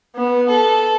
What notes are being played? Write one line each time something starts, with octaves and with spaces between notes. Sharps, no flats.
B3
A4